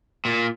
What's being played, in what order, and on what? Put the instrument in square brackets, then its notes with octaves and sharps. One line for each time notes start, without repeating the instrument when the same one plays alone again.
[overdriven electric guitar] A#2